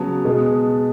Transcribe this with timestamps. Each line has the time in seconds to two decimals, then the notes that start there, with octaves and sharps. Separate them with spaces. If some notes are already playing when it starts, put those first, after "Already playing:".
Already playing: C#3 F#3 B3 A5
0.25 B2 G#3 B3